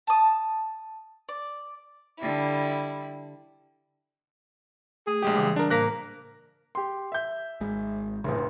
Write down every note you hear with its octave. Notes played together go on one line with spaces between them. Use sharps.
A5 D#6
D5
D3 G3 E4
A3 G#4
A#1 G#3 G4
C#3 E3 G3
D4 A#4
A2 A#3 C5 F5 F#6 A#6 B6
G4 C6
E5 G6
G#1 G#3
F1 A#1 A2 C#3